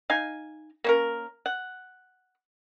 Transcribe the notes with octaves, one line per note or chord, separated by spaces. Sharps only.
D#4 F5 G#5
A#3 C#4 A#4
F#5